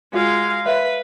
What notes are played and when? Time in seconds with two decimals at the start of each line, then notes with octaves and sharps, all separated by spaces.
0.13 G#3 F4 F#4 G#4 F5
0.66 B4 C#5 E5 F5